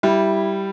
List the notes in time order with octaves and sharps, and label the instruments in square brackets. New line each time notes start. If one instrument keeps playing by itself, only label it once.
[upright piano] G3 [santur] E4